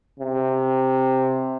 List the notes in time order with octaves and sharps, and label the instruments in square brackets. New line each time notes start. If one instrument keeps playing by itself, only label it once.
[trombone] C3